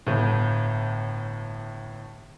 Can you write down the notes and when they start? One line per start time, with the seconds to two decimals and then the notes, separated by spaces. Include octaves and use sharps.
0.07 G1 A2